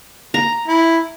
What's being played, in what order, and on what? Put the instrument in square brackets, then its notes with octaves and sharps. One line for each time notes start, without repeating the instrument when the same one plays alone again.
[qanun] A#5
[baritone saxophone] E4